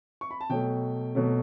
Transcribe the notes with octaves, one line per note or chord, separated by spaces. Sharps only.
C#6
B5
A5
B2 F#3 A3 G5
B2 F#3 A3